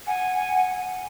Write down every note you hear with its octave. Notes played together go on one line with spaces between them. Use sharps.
F#5 G#5